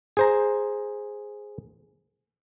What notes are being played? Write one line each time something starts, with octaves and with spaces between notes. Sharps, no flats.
G#4 C5 A#5